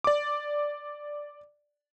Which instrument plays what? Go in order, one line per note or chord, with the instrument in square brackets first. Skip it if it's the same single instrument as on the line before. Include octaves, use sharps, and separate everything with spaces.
[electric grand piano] D5 D6